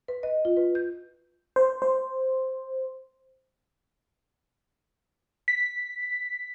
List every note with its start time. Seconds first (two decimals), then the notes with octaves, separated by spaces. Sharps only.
0.08 B4
0.23 D#5
0.45 F4
0.57 B4
0.75 G6
1.56 C5
1.82 C5
5.48 B6